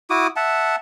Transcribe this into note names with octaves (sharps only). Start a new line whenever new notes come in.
E4 F#4 D6 D#6
E5 F#5 A5